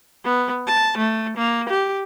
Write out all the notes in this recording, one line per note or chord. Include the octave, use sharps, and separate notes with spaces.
B3
A5
A3
A#3
G4